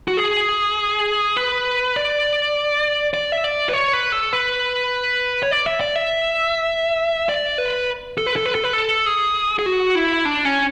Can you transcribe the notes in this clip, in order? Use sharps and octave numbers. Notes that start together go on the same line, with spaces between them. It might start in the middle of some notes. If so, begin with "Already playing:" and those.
F#4
G#4
B4
D5
D5
E5
D5
B4
C#5
B4
A4
B4
C#5
D5
E5
D5
E5
D5
B4
A4
B4
A4
B4
A4
B4
A4
G#4
G#4
F#4
E4
D4
C#4